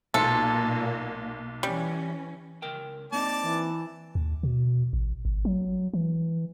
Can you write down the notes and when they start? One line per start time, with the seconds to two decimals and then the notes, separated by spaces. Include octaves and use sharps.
0.14 B1 A#2 A#3 A4 C6
1.63 E3 G3 C#4
2.62 C#2 A#4 G5
3.12 A#3 C4 D#4 D5 A5
3.44 E3
4.15 D#2
4.43 B2
4.93 A1
5.25 G#1
5.45 F#3
5.94 E3